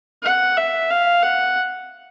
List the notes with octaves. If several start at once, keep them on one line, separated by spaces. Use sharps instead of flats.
F#5
E5
F5
F#5